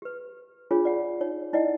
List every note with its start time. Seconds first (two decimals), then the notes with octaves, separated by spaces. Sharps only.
0.02 G4 B4
0.71 D4 F4 G#4 C#5
0.85 D5 F#5
1.21 D#4 C#5
1.53 D#4 E4 D5 D#5 F#5